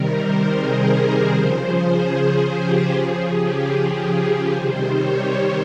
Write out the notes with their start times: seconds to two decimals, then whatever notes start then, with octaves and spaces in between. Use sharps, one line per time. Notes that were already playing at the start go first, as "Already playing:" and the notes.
Already playing: C3 D#3 G3 A#4
0.12 C5
0.52 G#4
0.91 A#4
1.31 C#3 F3 C5
1.72 G#4
2.51 G4
2.91 C#3 F3 G#4
3.31 G4
3.71 G4
4.12 G#4
4.51 C3 D#3 G3 C5
4.91 C#5